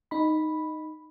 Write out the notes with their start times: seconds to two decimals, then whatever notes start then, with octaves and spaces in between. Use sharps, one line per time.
0.11 D#4 B5